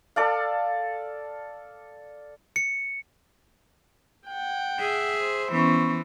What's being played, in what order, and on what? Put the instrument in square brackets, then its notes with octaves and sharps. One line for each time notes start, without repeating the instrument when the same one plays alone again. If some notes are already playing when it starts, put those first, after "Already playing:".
[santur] A4 D5 F5
[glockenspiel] C#7
[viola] F#5 G5
[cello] G#4 E5
[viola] C5
[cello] E3 [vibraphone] B3 C#4 C#6